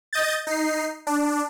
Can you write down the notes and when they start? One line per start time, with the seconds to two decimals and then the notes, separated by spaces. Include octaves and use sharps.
0.13 D#5 G6 A6
0.47 D#4 C7
1.07 D4